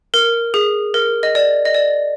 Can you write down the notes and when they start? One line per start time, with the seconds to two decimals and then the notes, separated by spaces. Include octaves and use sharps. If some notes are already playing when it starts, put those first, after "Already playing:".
0.14 A#4
0.54 G#4
0.94 A#4
1.23 D#5
1.35 D5
1.65 D#5
1.75 D5